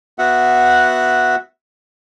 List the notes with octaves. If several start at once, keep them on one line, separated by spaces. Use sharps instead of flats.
B3 F#4 E5 F#5